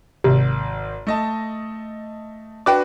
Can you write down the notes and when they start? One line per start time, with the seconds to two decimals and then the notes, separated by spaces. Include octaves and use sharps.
0.24 G#1 C3
1.07 A3 D#5 A5
2.66 D4 F#4 B4 G5 D6